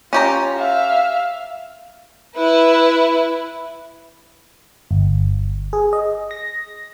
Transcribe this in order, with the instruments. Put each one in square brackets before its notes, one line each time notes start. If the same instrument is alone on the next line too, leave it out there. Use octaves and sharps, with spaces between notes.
[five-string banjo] C#4 G4 A#5 [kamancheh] F4
[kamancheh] E5 F5
[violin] E4 B4
[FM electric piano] G1
G#4
D#5
A#6